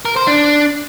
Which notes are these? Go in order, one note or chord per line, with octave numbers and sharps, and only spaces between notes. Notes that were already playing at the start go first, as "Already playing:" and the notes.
A#4
C5
D4